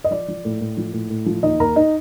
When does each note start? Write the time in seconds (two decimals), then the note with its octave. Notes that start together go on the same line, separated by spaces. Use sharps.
0.04 D#5
0.11 F3 D5
0.28 F3
0.45 A2
0.61 A2
0.77 F3
0.93 A2
1.10 A2
1.26 F3
1.43 D#2 D#4 D#5
1.60 D#2 A#4 A#5
1.76 D#4 D#5